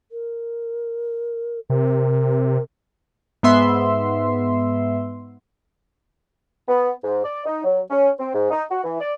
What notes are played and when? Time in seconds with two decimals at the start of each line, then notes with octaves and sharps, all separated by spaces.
0.12 A#4
1.70 C3 A#4
3.43 G#2 B3 E5 C6
6.68 B3
7.04 G#2
7.24 D5
7.46 D#4
7.64 F#3
7.89 C#4
8.19 C4
8.35 G#2
8.51 D#4
8.71 F#4
8.84 E3
9.01 D5